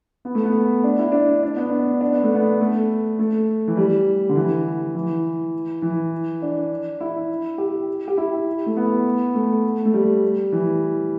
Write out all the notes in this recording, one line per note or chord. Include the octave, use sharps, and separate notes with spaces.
B3
A3
B3
D4
E4
D4
D4
B3
D4
D4
B3
A3
B3
A3
A3
E3
G3
D3
E3
E3
E3
D4
E4
G4
G4
E4
A3
B3
A3
A3
G3
E3